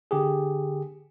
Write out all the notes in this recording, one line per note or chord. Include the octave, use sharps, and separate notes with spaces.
D3 G4 G#4